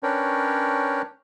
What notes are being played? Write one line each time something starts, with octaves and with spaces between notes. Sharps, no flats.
C#4 D4 A#4 B4 C#5 G5